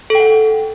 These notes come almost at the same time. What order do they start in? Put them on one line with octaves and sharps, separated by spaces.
A4 G5 F#5